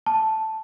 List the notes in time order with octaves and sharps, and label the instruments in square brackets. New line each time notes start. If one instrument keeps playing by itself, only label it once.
[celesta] A5